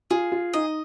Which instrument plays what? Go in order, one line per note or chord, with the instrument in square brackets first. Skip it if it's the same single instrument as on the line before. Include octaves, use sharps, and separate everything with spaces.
[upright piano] F4 [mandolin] G#4
[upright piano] F4
[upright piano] D#4 [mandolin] D#5